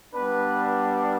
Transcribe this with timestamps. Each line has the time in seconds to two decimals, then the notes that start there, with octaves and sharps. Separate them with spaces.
0.13 G3 B3 D4 B4